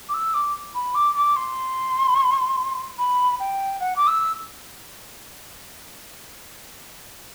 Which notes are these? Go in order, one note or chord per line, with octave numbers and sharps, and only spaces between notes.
D6
E6
D6
B5
D6
D6
C6
B5
G5
F#5
D6
E6